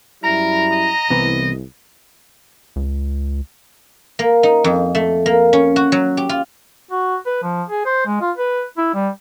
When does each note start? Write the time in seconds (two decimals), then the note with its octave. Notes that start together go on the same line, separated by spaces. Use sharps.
0.24 F#2 G3 E4 A#4 A#5
0.72 D#5
1.10 C2 C3 E3 B3
2.76 C#2
4.19 A#3
4.43 D#4
4.64 F2
4.95 A3
5.26 A#3
5.53 C#4
5.76 F#4
5.92 F#3
6.17 G4
6.29 F4
6.91 F#4
7.26 B4
7.43 F3
7.69 G#4
7.86 C5
8.06 G#3
8.21 F4
8.38 B4
8.78 E4
8.94 G3